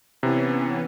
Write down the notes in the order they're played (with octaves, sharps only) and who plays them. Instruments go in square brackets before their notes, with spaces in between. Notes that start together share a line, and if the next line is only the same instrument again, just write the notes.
[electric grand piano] C3 [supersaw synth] E3 B3 C#4